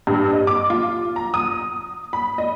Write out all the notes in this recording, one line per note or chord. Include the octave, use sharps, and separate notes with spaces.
G2
D#5
D6
F4
A#5
D#6
B5
D#5